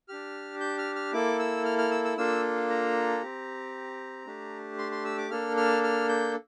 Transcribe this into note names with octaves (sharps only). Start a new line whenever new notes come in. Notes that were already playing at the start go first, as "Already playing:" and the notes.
D4 G4 F6
G6
F6
F6
A#3 E4 A4 D6
E6
F6
F6
E6
E6
A#3 D4 F4 A4 E6
A#5
C4 G4
A3 D4 G4
C6
C6
E6
D6
A#3 D4 A4 F6
F6
F6
G6